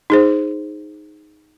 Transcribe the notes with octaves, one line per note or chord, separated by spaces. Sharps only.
D#4 G#4 C5